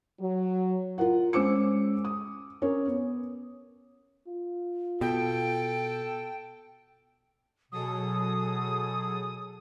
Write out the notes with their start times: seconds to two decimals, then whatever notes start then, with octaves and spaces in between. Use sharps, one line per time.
0.20 F#3
0.98 F4 A#4 F#5
1.33 G#3 C#4 C5 D6 E6 C#7
2.05 D#6
2.62 C#4 A#4 C#5
2.86 B3
4.27 F4
5.01 B2 A4 G5
7.72 B2 F#3 G#4 A4 D#6